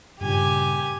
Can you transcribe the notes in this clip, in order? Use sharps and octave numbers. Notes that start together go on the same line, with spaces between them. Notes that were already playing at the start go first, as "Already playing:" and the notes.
G2 A#2 C#3 G4 G#5